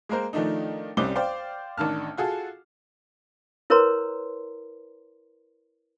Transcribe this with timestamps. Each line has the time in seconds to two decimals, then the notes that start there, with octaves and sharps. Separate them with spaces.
0.09 G#3 A#3 A#4 C5
0.33 D#3 F3 A3 D4 D#4
0.97 C2 G3 C4 C#4 D6 G7
1.16 C5 D5 F5 G5
1.78 A1 D#3 D4 A5 F6
2.17 F4 F#4 G#4 A4
3.70 E4 A#4 B4 C#5 A#5 C6